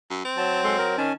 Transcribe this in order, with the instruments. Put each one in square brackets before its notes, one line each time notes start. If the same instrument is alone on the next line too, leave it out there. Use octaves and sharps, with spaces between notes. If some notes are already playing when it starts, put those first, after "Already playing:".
[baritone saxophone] F#2
C4
[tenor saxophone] F#3 [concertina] A5
[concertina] G#3 A4 C6
A#4
[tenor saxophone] D#3 [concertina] C#4 G#5 A5